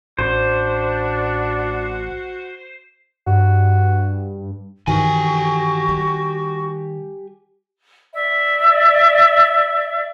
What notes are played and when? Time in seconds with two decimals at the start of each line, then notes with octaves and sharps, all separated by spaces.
0.19 A1 D4 F#4 C5
3.27 G2 F#4
4.87 G2 D#3 E3 F#4 G4 G#5
5.89 G3
8.14 D5 E5